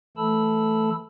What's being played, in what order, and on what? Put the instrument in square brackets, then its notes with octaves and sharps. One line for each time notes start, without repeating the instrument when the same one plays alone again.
[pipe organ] E3 A3 A4 A5 B5 E6